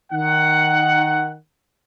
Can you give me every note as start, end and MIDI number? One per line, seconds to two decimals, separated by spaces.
0.12 1.34 51
0.12 1.34 78